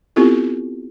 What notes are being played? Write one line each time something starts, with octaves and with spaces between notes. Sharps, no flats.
B3 C4 E4 F4 G4 A4